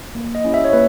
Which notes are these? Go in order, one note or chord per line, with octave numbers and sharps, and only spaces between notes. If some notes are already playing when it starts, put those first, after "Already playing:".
A#3
D#5
C#4 E4 G4
E5
C#5
A#3 B4